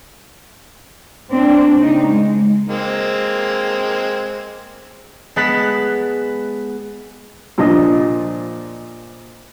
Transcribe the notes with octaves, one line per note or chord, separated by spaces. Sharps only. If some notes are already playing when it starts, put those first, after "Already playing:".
A#3 C4 D4
C#3 D#4
G#3
G#3 A#3 C4
G#3 B3 A5 F#6 B6 E7
A#2 F3 D4 D#5